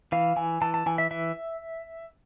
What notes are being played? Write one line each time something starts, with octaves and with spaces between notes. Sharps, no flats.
E3 F5
E3 G#5
E3 A5
A5
E3 G#5
E5
E3 E5